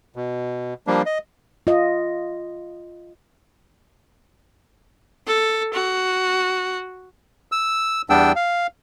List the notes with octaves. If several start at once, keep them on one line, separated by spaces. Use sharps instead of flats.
B2
F3 G3 A#3 D4
D#5
F4 D#5
A4
F#4
E6
E2 G3 B3 D4 G5 E6
F5